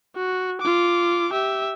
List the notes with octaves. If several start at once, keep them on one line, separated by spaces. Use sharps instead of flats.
F#4
F4 D6
G4 E5